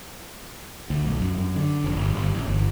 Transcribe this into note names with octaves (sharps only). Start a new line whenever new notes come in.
D2
B1
F#2
F#2
D3
F1
G1
G1
A1
G1